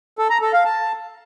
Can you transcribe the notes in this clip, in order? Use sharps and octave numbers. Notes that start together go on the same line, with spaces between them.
A4
A#5
A4
F5
A5